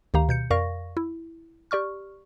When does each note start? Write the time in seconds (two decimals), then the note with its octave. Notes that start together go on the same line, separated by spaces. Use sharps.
0.14 D2 D#3 G4 F5 A#5
0.29 B2 G6 C#7
0.50 F2 A#4 D5 F5 C#6 A#6
0.97 E4
1.71 G4 D5 C#6 F6